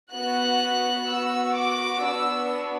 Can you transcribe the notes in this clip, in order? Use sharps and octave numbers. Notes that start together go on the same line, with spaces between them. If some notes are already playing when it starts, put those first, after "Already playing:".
B3 F#4 F#6
B3 F#4 E6
D6
B3 D4 F#4 E6